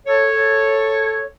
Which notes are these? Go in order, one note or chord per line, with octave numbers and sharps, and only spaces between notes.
A4 C#5